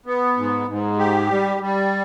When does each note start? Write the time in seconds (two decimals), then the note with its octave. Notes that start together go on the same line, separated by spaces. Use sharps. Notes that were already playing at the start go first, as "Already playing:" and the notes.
0.06 B3
0.37 G#2
0.68 G#2
0.99 G4
1.31 G3
1.61 G3